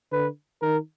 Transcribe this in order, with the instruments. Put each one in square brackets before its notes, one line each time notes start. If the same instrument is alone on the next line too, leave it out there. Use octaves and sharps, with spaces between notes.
[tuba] D3 [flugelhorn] B4
[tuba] D#3 [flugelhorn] A#4